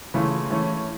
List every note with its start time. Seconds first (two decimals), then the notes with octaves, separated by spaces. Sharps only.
0.14 C#3 E3 A3 C#4 F4
0.50 E3 A3 C#4